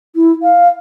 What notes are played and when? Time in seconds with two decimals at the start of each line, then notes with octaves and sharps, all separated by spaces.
0.16 E4
0.43 F5